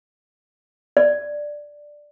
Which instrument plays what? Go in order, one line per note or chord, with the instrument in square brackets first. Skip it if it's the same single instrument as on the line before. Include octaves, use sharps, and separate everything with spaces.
[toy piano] D5